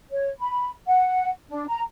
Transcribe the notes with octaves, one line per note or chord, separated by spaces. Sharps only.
C#5
B5
F#5
D4
A#5